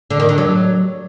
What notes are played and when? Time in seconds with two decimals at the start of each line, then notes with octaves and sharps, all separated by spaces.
0.10 D3
0.20 D#3
0.29 D3
0.38 F#3